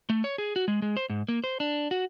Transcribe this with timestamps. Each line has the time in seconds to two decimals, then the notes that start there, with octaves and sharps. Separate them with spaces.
0.10 A3
0.24 C#5
0.38 G#4
0.56 F#4
0.68 G#3
0.82 G#3
0.97 C5
1.10 G#2
1.29 A#3
1.44 C5
1.60 D4
1.91 F#4